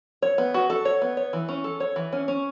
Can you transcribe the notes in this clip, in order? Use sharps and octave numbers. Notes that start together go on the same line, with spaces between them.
C#5
B3
F#4
A4
C#5
B3
C#5
E3
C#4
A4
C#5
E3
C#4
C#4